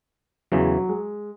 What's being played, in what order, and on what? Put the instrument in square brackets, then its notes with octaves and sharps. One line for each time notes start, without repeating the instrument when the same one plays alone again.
[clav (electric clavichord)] E2 C#3 E3 [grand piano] F#3
[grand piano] G#3